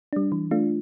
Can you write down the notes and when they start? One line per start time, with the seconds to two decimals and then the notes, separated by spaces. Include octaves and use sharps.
0.13 G3 D4
0.32 E3
0.51 A3 D4 F4